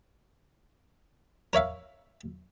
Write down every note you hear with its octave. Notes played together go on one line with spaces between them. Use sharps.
A#4 C#5 E5 F5